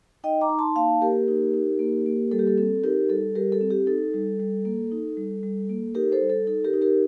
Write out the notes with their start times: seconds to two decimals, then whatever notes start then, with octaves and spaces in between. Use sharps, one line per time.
0.24 D#4 D#5 G5
0.41 A#5 D6
0.49 D#4
0.59 A5 C6
0.76 A#3 F5 A5
1.02 A#3 G4 A#4
1.28 D#4
1.54 D#4
1.79 A#3
2.06 A#3
2.31 G3 A4
2.39 G4
2.47 A4
2.57 C4 A4
2.84 D#4 G4 A#4
3.10 G3 A4
3.35 G3 G4 A#4
3.52 A4
3.61 C4
3.71 G4
3.87 D#4 A4
4.14 G3
4.40 G3
4.65 A#3
4.92 D#4
5.17 G3
5.43 G3
5.69 A#3
5.95 D#4 G4 A#4
6.12 A4 C5
6.21 G3
6.30 A4
6.47 D#4 A4
6.65 G4 A#4
6.73 D#4
6.82 G4 A#4